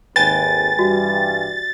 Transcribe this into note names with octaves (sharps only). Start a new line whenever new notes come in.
G#1 D#2 B4 G5 G#5 A6
G2 E3 G3 F#4